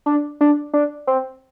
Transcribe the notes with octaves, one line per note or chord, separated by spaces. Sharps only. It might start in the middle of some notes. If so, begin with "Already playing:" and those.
D4
D4
D4
C4